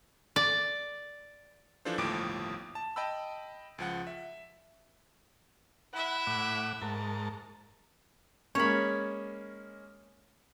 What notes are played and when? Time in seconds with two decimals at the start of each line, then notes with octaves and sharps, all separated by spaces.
0.36 D5
1.85 E3 F3 D4 F4 A4 C5
1.98 G1 D#2 A2 F3 D6 D7
2.75 A5
2.96 D#5 G5 A5 B5 E6
3.78 C#2 F3 F#5
4.07 E5
5.93 E4 E5 F#5
6.27 A2 F#5 D6
6.82 G#2 A#4 A5
8.55 G#3 A#3 C#4 C#5 B5